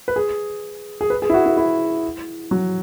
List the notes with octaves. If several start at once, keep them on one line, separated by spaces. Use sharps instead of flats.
B4
G#4
G#4
B4
G#4
E4
F#4
E4
E4
F#3